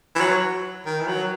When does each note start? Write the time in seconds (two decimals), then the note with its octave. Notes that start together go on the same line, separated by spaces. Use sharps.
0.16 E3
0.21 F#3
0.86 D#3
1.01 E3
1.08 F#3